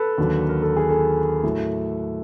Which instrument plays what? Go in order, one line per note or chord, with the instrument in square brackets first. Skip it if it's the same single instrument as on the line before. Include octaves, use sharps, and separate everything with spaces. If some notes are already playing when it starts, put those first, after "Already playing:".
Already playing: [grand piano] A4 B4
D#2 D3 F#3
A#4
A4
G#4
A4
A2 F#3